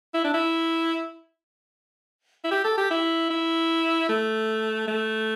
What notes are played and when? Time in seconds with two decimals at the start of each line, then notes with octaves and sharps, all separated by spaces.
0.14 E4
0.25 D4
0.34 E4
2.44 E4
2.51 G4
2.64 A4
2.78 G4
2.91 E4
3.30 E4
4.09 A3
4.88 A3